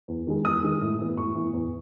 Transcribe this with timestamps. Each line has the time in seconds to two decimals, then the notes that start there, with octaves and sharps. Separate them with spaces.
0.08 E2
0.27 D#3 G#3
0.44 E2 D#6
0.63 D#3 G#3
0.82 A2
0.99 E3 B3
1.17 A2 C#6
1.35 E3 B3
1.53 E2